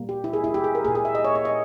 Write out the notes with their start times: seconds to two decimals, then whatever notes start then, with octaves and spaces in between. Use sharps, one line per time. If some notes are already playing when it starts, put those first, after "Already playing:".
Already playing: A#2 G3 A#3
0.09 G4
0.24 E4
0.33 G#4
0.44 E4
0.54 G4
0.64 G#4
0.75 A#4
0.85 A#2 A#3 G#4
0.95 G#4
1.05 E5
1.15 D#5
1.25 C#5
1.35 C#5
1.45 D#5